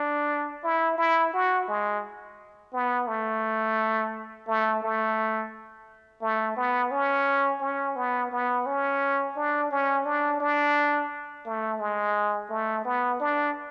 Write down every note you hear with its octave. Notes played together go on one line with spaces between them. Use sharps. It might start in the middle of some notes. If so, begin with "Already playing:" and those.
Already playing: D4
E4
E4
F#4
G#3
B3
A3
A3
A3
A3
B3
C#4
C#4
B3
B3
C#4
D4
C#4
D4
D4
A3
G#3
A3
B3
D4